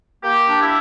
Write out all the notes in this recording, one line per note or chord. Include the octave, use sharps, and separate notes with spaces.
A#3 G4
D4
E4